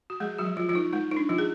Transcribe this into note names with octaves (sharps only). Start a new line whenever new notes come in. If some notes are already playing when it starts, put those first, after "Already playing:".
F#4
F3 G#3 G#4
F#3 F#4
F3
F3 F4
F3 F4
D#4
G#3 D#4
D#4
D4
F3 F4
G#4